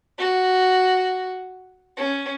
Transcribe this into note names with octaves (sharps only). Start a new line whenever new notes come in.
F#4
C#4